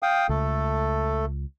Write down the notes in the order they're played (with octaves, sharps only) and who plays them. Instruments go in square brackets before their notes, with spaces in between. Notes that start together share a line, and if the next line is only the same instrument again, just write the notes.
[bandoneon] F5 G5 D#6
[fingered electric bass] C#2 [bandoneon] A3 A4